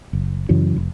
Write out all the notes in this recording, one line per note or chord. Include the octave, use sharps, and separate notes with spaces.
F#1
F#2 C#3 E3 F#3
F1